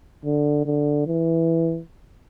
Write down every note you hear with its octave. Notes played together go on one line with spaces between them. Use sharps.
D3
D3
E3